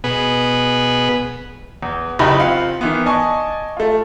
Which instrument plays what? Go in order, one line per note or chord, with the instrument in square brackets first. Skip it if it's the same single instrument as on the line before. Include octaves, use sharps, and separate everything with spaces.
[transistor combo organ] B2 B3 G#4 B4
[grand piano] E2
F#1 D#4 E4 G4 B5
C4 F4 F#5
D#3 E3 B3
D5 D#5 G#5 A5 C#6
A3 F4